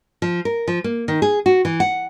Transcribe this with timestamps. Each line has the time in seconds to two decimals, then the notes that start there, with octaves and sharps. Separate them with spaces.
0.22 F3
0.45 A#4
0.68 F3
0.84 A#3
1.08 D#3
1.22 G#4
1.46 F#4
1.65 E3
1.80 F#5